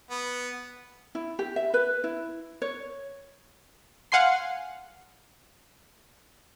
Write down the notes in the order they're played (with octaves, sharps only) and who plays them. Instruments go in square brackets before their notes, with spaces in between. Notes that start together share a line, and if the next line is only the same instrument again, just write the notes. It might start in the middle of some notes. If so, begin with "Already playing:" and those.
[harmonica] B3
[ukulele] E4
G4
E5
B4
E4
C#5
[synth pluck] F5 F#5 G#5 C6 C7